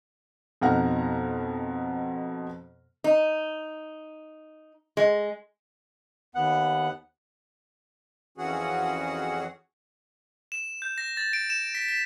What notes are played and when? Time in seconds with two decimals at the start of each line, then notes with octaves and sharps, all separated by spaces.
0.61 F2 B2 D#4 F#5 A#5 F6
3.04 D#4
4.97 G#3
6.35 D#2 B3 F#5
8.38 F2 E3 C#4 F#4 G#4 F#5
10.52 E7
10.82 G6
10.98 A#6
11.17 A6
11.33 D7
11.50 E7
11.75 B6
11.88 B6